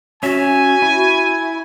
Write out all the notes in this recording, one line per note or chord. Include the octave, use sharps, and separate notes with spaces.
C#4 F#4 E5 G#5
E4